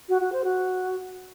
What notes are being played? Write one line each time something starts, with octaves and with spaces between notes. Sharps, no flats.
F#4
F#4
C5
F#4